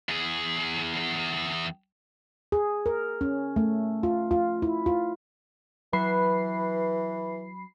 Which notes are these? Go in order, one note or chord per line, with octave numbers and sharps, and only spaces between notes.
E2 G#4
G#4
A#4
C#4
A3
F4
F4
E4
F4
E3 F#3 B4 B5 C7